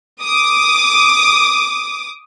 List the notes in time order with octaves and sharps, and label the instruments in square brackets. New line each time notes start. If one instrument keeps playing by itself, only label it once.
[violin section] D6 D#6